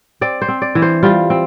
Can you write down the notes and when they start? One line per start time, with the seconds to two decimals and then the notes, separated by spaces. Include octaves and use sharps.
0.21 C4 D5
0.42 C5
0.48 C4
0.62 D5
0.75 E3
0.82 C5
1.03 G3 F4
1.30 C4